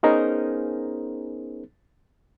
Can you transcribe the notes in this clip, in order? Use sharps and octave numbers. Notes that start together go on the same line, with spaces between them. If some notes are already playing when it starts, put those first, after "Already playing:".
B3 C#4 D#4 G#4 A#4 C5